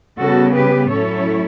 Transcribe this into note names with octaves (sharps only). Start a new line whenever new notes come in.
C#3 G3 B3 F#4 A4
G4 B4
A2 F#3 C#4 E4 A4 C#5